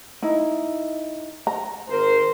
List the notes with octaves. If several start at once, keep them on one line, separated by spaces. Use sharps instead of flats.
D#4 E4
A#5
G#1 A#4 C5